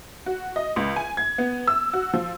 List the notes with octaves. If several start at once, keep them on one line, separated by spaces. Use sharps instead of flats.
F#4
D#5
C#2
G#5
G#6
B3
E6
F#4
F3